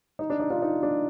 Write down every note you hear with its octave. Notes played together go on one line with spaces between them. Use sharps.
D#4
D4
D#4
D4 F4
D#4
D4